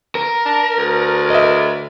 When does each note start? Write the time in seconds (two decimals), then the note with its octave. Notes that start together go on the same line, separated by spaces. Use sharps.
0.15 A#4
0.45 D4
0.77 D2
1.30 D#5 E5